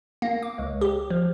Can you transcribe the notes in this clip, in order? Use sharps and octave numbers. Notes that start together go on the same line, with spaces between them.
A#3
D6
C#2
G4
F3